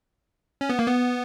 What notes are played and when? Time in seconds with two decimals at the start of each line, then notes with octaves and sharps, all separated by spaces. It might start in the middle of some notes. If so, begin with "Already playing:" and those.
0.61 C#4
0.69 B3
0.79 A#3
0.87 B3